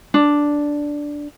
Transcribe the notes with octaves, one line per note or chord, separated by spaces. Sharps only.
D4